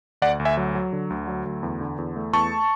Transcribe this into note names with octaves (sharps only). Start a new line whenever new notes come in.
D2 D5 F#5
D2
E5 G#5
F#3
F#3
D3
D2
F#3
D2
E2
D3
E2
A3
E2 A5 C#6